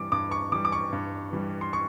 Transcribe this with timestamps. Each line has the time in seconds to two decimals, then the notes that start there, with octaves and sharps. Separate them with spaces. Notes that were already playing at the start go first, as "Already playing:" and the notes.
Already playing: G2 E3 G3 D6
0.12 G2 D6
0.31 C#6
0.52 E3 G3 D6
0.65 D6
0.72 C#6
0.93 G2
1.33 E3 G3
1.61 C6
1.73 C#6